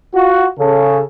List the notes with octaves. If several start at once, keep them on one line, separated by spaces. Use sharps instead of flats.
F4 F#4
C#3 A4